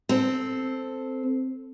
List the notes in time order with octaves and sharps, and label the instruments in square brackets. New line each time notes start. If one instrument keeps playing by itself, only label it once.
[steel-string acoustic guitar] C4 A4